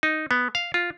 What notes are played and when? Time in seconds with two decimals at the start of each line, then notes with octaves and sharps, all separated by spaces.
0.03 D#4
0.31 B3
0.55 F5
0.74 F4